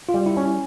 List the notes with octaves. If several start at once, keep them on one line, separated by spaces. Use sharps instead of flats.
F4
G3
E4
C#4